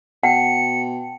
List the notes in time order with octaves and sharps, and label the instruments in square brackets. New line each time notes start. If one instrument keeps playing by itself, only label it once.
[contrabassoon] B2 [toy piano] F#5 [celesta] G5 A5 [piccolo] C#7